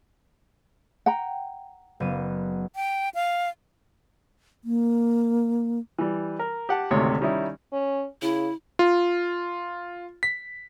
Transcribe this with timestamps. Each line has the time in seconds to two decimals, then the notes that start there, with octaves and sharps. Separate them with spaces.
1.06 F#5 G5 A#5
2.00 F#1 B3 D#7
2.76 G5
3.15 F5
4.64 A#3
5.98 E3 G3
6.39 A#4
6.69 G4 F#5 A5
6.91 G#1 D2 C3 A3 C#5
7.21 D#3 G3 C#4 D#4 E4
7.72 C#4
8.22 C#3 E4
8.79 F4
10.23 B6